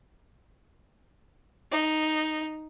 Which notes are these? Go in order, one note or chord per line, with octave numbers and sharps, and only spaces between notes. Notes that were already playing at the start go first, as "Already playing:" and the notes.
D#4